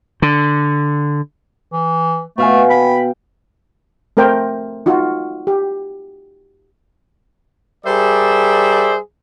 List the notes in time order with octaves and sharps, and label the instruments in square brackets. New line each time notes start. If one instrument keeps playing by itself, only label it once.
[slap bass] D3
[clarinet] E3
[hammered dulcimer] B2 F5 G#5 [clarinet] A3
[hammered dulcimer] G5 [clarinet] B5
[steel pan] A3 C4 A#4 C5 G5
D#4 F4 F#4
G4
[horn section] G3 G#4 A#4 C5 D5 E5